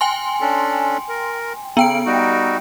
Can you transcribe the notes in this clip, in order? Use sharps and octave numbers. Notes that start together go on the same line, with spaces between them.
G5 G#5 C6
C#4 D4 A4
A#4
C#3 B3 G5 D7
G3 D#4 F#4